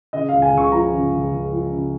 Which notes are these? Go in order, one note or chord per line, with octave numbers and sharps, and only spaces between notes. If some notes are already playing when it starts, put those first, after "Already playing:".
C#3 D#5
C#2 F5
G#5
C#2 C#6
F3 A#5
C#3
C#2
C#2
F3
C#3